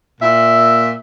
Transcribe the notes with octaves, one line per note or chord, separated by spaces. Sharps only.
A#2 E5